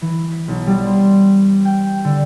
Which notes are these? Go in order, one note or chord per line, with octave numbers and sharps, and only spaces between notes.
E3
B6
B1
G3
C5
G5
D3